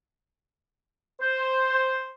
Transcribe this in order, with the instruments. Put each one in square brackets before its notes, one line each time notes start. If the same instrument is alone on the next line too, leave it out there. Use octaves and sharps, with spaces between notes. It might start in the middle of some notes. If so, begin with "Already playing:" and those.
[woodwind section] C5